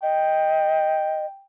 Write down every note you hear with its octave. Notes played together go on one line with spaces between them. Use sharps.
D#5 G5